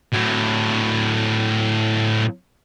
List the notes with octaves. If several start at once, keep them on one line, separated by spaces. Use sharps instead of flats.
A2 F#3